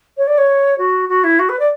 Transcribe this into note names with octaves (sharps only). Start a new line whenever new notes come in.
C#5
D5
C#5
F#4
F#4
E4
F#4
B4
D5